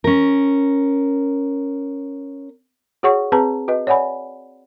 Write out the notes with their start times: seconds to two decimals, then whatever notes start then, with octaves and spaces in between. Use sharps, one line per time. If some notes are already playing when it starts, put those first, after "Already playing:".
0.04 C#4 A#4
3.03 F#4 G#4 C#5 F#5 C#6
3.32 C4 G#4 B4 A5 A#5
3.68 F#4 B4 D#5
3.87 C#5 D5 F#5 G#5 B5